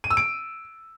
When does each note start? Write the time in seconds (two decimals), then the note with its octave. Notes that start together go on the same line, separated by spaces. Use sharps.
0.04 D#7
0.10 E6
0.17 D7